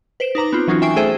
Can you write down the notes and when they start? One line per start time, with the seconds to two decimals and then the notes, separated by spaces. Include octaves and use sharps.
0.20 B4 C5 D7 E7
0.35 D#4 B4 A#5 D6
0.53 B3 C4 F4
0.68 E3 F#3 C#4 D#4 F4 F#4
0.82 E5 G5 G#5 C#6 C7 D7
0.96 A3 G#4 A4 C5 E5 G5